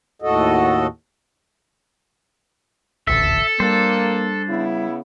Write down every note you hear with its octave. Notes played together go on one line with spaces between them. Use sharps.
D#2 A2 F#4 A4 D#5
D#1 A1 D2 A4 E5
G3 A#3 D4 C5
C#3 B3 E4